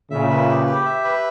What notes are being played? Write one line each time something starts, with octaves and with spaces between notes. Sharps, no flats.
A#2 C#3 E5
B4
G4
G4
E5
B4